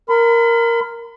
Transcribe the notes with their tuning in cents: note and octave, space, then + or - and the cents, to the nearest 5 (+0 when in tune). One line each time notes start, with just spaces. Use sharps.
A#4 +0 B5 +40